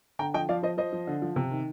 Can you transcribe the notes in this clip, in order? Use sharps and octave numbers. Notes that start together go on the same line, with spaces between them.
D3 G5 A#5
F3 D#5 G5
F3 D5 F5
F3 C5 D#5
F3 C5 D#5
F3
D3
F3
C3
D#3